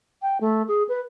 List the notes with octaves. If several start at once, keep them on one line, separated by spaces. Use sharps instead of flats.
G5
A3
G#4
B4